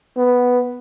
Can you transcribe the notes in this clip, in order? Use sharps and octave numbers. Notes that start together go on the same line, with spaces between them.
B3